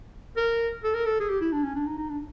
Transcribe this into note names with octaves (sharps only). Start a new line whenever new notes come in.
A#4
A4
A#4
A4
G#4
G4
E4
D4
C#4
D4
D#4
D#4
D4